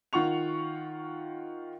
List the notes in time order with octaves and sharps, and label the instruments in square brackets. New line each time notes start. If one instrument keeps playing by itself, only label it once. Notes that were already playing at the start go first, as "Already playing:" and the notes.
[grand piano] D#3 F4 F#5 C#6 F7